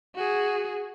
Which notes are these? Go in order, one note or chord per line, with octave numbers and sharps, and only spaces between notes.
F#4 G#4